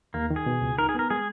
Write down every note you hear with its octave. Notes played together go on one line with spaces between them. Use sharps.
D#2 A#3
D#3
G#4
B2
C#2
D#4 A#4
G#4
B3 A#4
G#3 G#4